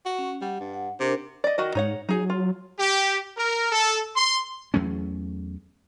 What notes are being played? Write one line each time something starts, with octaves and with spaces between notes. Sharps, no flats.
F#4
C#4
G3 F#5
G2
F#5
C3 D4 A#4
D5 D#5
D#3 F#4 D#5
G#2 D#4 C#5 F#5
F#3 D#4 G#4
F4
G4
A#4
A4
C6
E2 F#3 A3 C#4